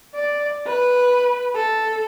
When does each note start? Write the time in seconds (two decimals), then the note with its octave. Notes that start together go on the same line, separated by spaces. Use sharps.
0.15 D5
0.66 B4
1.55 A4